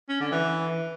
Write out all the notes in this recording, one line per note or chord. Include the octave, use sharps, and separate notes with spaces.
C#4
D3
E3